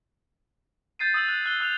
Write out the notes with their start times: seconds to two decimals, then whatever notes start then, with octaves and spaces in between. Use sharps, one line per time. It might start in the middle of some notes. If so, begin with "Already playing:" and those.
0.99 G6 A6 C7 D#7
1.14 D#6 E6 F#7
1.26 F#6 D#7
1.46 F#6 G7
1.60 E6 F#6 F7